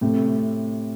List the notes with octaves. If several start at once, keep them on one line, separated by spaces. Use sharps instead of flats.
A2 C3